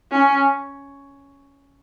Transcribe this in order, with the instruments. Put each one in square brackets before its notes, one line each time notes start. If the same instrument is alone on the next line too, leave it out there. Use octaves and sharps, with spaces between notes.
[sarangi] C#4